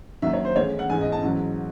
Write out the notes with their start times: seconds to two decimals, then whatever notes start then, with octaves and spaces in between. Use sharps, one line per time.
0.22 D#2 D#3 F#3 E5
0.33 C#5
0.45 C5
0.56 A1 A2 E3 G#3 C#5
0.79 F#5
0.89 A1 G#2 E3 G#3 G#5
1.01 D#5
1.12 A5
1.23 A1 G#2 F#3